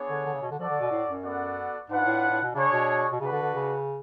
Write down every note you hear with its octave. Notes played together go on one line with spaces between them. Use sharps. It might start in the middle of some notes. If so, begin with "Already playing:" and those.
Already playing: B3 D4 G#4 C#5
D3
D3
C#3
B2
D3
F3 F#4 A4 D5 F#5
D3
B2
A2
F#2
B3 F#4 A4 D5 F#5
G#2 D4 F4 B4 F#5
A2
A2
B2
C#3 D4 G#4 C#5
B2
B2
C#3 D4 F#4 B4
D3
D3
C#3